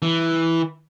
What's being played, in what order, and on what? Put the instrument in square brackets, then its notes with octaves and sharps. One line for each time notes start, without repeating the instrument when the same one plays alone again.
[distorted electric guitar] E3